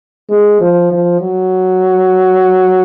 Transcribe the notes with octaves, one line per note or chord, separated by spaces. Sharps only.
G#3
F3
F3
F#3